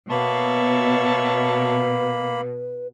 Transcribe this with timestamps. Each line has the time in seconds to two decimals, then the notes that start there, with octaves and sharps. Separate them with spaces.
0.10 B2 A#3 B4 C#5 E5 A5 B5